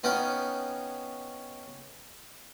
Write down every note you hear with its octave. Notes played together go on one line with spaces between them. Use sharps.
B3 C#4 D#4 C#5 F5 G5